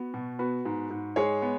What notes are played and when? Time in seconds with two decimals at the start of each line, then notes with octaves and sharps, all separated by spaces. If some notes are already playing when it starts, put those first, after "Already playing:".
Already playing: B3 F#4
0.14 B2
0.39 B3 F#4 B4
0.65 G#2
0.90 G#2
1.16 G#3 G#4 C#5
1.42 B3